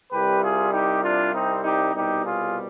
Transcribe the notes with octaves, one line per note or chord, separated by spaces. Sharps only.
C2 C3 G3 G4 B4
F4 G#4
D#4 G4
D4 F4
C4 D#4
D#4 G4
C2 B2 G3 D#4 G4
F4 G#4